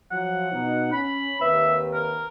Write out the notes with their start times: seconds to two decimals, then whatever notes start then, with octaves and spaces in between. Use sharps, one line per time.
0.11 F3 F#3 F#5
0.52 B2 D#4
0.92 C#4 B5
1.41 D#2 C3 B4 E5
1.94 A#4